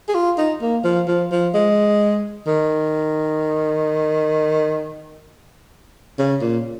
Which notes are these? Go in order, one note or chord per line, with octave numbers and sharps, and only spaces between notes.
G#4
F4
D#4
A#3
F3
F3
F3
G#3
D#3
C#3
A#2